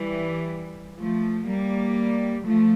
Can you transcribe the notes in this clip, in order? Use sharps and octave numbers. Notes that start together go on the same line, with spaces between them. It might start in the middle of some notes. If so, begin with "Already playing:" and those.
Already playing: E3 G3
F3 A3
G3 A#3
F3 A3